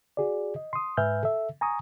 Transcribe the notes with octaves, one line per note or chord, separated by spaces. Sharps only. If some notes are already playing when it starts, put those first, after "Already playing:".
F#4 G#4 D5
D#5
C6 D#6
G#2 B4 E5 G#5 F6 G6
A4 E5
G#5 A#5 C#6 D#6